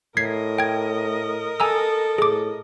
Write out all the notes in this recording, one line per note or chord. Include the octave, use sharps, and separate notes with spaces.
A2 A#4 D#5 G#6 B6 C7
G5 G#6
A4 G#5 A#5 E6
A2 G#4 D6